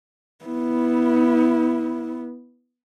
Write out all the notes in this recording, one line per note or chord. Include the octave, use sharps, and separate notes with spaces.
B3 E4